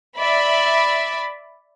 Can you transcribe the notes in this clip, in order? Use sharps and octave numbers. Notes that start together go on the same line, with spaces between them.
D5 E5 B5